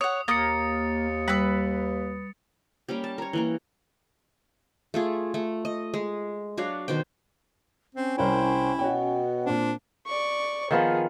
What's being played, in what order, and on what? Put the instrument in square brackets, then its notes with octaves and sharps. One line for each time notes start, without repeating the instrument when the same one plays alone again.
[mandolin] C#5 F#5 [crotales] D#6
[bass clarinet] D#2 [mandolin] A#3 D#6 [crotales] A6 C#7
[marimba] G3 [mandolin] B4 E6
[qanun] G3 A#3 C#4 G4
A5
A#4 C#5
E3 A#3 A#4
A3 F4 G#4
A3
D#5
G#3
F#3 D4 F#4 F5
B2 D#3 C5 G5
[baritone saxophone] C4 [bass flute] C#4
[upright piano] C2 A#4 C#5 [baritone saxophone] E4 [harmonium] C5 G5
[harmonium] B2 B3 [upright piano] F#4 C#5 G5
[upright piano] A#2 C4 [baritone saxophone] D4
[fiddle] D5 C#6
[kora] D#3 F3 B3 [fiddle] G#4